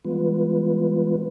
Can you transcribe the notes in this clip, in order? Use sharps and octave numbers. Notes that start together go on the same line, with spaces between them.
E3 G3 G#3 B3 F4 B4